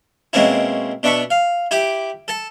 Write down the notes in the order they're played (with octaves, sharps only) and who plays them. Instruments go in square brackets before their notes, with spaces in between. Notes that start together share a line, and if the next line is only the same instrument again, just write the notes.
[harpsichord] B2 G#3 A#3 C4 C#4 E4
B2 D4 E5 B5 C#6
F5
E4 G4 G5 D6
A4 A5